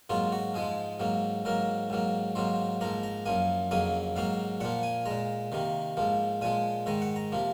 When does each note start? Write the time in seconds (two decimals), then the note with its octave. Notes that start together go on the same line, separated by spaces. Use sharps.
0.10 G#2 F#3 A#3 F4
0.32 F#4
0.54 G#2 F3 G#3 G#4
1.00 G#2 F#3 A#3
1.45 G#2 F#3 A#3 A#4
1.90 G#2 F#3 A#3
2.35 G#2 F#3 A#3 C5
2.81 G#2 F3 A#3 A#5
3.03 A#5
3.26 F#2 F3 A#3 G#5
3.71 F2 C#3 F#3 A#3 G#5
4.16 G#2 F#3 A#3 F5
4.60 A#2 F3 A#3 F#5
4.83 G#5
5.06 G#3 A#5
5.11 A#2
5.52 C3 D#3 A#3
5.97 G#2 F3 A#3
6.41 A#2 F3 G#3 G#5
6.86 G#2 D#3 G#3 A#5
7.02 F#5
7.16 A#5
7.32 C3 F3 A#3